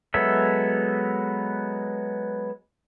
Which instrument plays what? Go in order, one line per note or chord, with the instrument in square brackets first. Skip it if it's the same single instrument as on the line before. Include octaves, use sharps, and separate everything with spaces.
[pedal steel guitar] F#3 G#3 B3 A4 E5